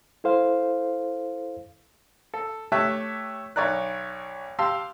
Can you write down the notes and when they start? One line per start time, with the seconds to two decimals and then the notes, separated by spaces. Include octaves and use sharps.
0.24 E4 A4 C5 F5
2.34 A4
2.72 A3 G4 C#5 E5 A5 F#6
3.56 B1 C#5 D5 A#5 F#6
4.59 G4 F5 A5 C6 E6